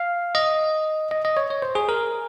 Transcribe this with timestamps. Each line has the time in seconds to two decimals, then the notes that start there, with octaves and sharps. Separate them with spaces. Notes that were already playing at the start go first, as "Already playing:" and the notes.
Already playing: F5
0.35 D#5
1.11 D#5
1.25 D#5
1.37 C#5
1.50 C#5
1.62 C5
1.75 G#4
1.89 A#4